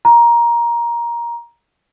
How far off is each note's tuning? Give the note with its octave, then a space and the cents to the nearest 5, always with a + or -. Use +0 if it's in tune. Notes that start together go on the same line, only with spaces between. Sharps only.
A#5 +15